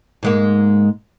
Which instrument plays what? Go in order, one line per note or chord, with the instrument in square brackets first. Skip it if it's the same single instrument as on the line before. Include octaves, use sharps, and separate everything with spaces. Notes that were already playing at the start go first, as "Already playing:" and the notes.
[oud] G#2 G#3 A#3